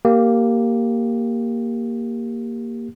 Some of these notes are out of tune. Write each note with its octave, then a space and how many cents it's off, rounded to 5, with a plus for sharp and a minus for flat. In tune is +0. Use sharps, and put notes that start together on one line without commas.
A#3 +0 G4 +0